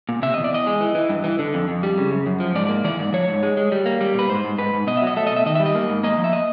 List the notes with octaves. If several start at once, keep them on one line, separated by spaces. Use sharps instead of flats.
A#2
C3 E5
E2 D#5
D5
E2 D#5
G#3
E3
E3
G2
E3
D3
F2
F2
G3
C#3
F#2
F#2
F3
G#2 D5
A#3
E3 D5
G#2
F3 C#5
G#2
G#3
G#3
G3
A#3
G3
A#2 B4
G#2 C5
G#2
G#2 B4
G#2
B2 D#5
E5
F#3
D#5
A3 E5
D#5
B2
E5
D#3 D#5
G3 E5
D#5
A#3
G#2
A#3 D#5
F3
E5
D#5